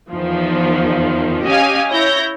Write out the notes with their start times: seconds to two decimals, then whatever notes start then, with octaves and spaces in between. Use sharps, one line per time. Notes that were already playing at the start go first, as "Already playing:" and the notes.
0.11 E2 D#3 F3
1.45 C#4 G4 D#5 F5 G#5
1.91 E4 C#5 G6 A#6